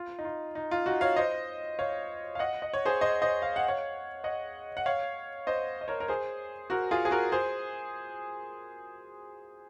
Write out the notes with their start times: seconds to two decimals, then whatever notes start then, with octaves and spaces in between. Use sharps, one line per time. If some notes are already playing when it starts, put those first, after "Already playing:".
Already playing: F4
0.19 D#4
0.25 F4
0.55 D#4
0.71 F4
0.86 D#4 F#4
1.01 C#5 F5
1.16 C5 D#5
1.79 C#5 F5
2.35 F5
2.39 D#5 F#5
2.62 D#5
2.74 C#5
2.85 G#4 C5
3.01 C5 D#5
3.22 C5 D#5
3.42 F5
3.56 F#5
3.68 C#5 F5
4.24 D#5 F#5
4.77 F#5
4.86 C#5 F5
5.47 C5 D#5
5.81 D#5
5.88 A#4 C#5
6.00 A#4
6.08 G#4 C5
6.70 F#4 A#4
6.91 F4 G#4
7.05 G#4
7.11 F#4 A#4
7.32 G#4 C5